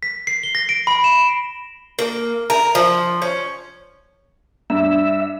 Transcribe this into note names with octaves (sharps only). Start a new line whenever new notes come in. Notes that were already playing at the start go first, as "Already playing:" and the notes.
B6
C7
G7
A#6
D7
B5
E7
A#3
A#4
F3
C#4
G2 E5